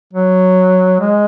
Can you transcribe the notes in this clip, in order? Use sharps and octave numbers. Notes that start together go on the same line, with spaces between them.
F#3
G#3